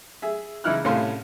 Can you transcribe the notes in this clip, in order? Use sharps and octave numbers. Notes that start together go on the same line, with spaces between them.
G#4 E5
C#2 E3 D#4 E4 F6 F#6
C2 A2 A3 C#4 F5 C6